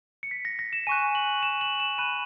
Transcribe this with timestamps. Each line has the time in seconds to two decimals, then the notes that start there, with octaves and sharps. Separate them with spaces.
0.23 C#7
0.31 B6
0.45 A#6
0.59 A#6
0.73 E7
0.87 G#5 C#6 F#6 D#7
1.15 F#7
1.43 E7
1.61 F#7
1.80 E7
1.98 B5 F#6 D#7